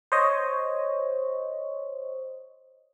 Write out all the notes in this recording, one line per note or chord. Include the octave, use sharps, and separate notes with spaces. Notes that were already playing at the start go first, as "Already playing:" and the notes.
C5 C#5 D#5